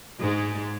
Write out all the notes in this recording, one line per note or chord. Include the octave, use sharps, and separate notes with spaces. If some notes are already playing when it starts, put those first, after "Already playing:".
G#2 G#3